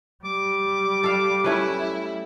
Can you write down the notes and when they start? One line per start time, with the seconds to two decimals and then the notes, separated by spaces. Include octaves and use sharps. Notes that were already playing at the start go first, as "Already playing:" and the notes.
0.25 G3 D6
1.03 A4 F5
1.44 A3 C#4 E4 B4